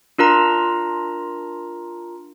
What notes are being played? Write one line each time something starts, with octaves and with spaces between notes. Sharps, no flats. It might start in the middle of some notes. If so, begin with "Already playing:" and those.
D4 F4 A#4 A#5